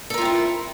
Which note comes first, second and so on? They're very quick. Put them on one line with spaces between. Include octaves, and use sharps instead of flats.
A4 A#4 F4 C4 E4